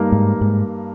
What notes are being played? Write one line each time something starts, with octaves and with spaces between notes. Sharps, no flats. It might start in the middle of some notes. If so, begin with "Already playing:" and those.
Already playing: G2 G3 A#3 D#4 A#4
G#2
G#2